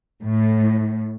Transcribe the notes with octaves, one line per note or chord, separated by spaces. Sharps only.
A2